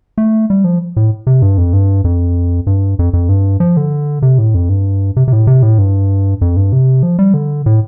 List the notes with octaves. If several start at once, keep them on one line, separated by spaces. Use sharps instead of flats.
A3
G3
F3
A2
C3
G2
F2
G2
F2
G2
F2
F2
G2
F3
D3
C3
A2
F2
G2
C3
C3
A2
C3
A2
G2
F2
G2
C3
F3
G3
D3
A2